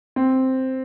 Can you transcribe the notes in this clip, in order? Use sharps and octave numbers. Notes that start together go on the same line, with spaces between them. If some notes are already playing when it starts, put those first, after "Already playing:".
C4